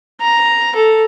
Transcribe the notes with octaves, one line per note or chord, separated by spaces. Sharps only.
A#5
A4